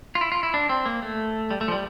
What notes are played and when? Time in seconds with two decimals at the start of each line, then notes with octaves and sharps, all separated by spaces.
0.15 F4
0.21 E4
0.32 F4
0.43 E4
0.54 D4
0.69 C4
0.86 A#3
1.02 A3
1.51 G3
1.61 A3
1.68 F3
1.72 G3